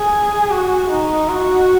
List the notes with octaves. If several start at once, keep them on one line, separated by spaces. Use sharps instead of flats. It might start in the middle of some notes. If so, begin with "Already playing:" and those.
Already playing: G#4
F#4
D#4
F#4